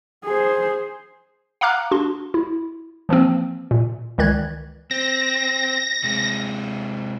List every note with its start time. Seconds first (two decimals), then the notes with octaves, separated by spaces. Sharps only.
0.25 G#4 C5
1.61 F5 F#5 A#5 D6 F6 F#6
1.91 D4 F#4 C6
2.34 E4
3.09 E3 F3 A#3 C4
3.71 A#2
4.18 C#2 D#3 E3 D5 F#6 G#6
4.91 C4 A#6
6.04 C3 G#3